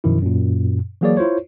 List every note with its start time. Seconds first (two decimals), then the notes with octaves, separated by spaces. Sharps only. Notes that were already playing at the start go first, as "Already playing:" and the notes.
0.04 F#2 B2 D#3 F3 E4
0.22 F#2 A#2
1.01 E3 F#3 A#3 G#4 C#5 D5
1.17 E4 F4 C5 C#5